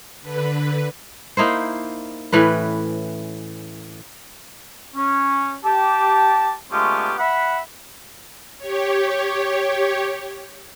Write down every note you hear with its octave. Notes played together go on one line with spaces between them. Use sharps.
D3 B4
A#3 D#4 E4 C5
A2 E3 C#4 B4
C#4
G4 A5
G#3 A3 B3 C#4 F4 G4
E5 F#5 B5
G4 C#5